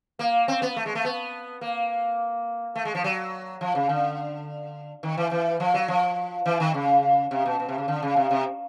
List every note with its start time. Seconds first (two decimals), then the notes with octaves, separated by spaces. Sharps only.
0.19 A#3
0.48 C4
0.62 B3
0.76 A3
0.86 G#3
0.95 A3
1.05 B3
1.61 A#3
2.75 A3
2.85 G#3
2.95 F3
3.04 F#3
3.61 F3
3.75 C#3
3.89 D3
5.03 D#3
5.17 E3
5.31 E3
5.60 F3
5.74 F#3
5.88 F3
6.46 E3
6.60 D#3
6.74 C#3
7.31 C3
7.45 B2
7.59 B2
7.68 C3
7.78 C#3
7.88 D3
8.02 C#3
8.16 C3
8.31 C3